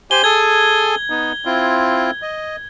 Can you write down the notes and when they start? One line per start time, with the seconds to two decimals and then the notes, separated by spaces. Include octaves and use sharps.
0.11 G4 C5 G#5 G7
0.24 G#4 A4 G#5 G#6
1.10 B3 D#4
1.45 C4 E4 F4
2.22 D#5